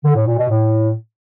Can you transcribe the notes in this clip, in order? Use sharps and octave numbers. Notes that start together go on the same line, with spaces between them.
D3
A2
A#2
B2
A2